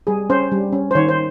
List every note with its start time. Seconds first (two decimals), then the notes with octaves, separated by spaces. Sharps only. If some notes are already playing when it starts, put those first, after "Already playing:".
0.07 G3 G#4
0.30 C#4 C5
0.52 G3
0.72 C#4
0.91 C5
0.95 D#3 C#5
1.09 C5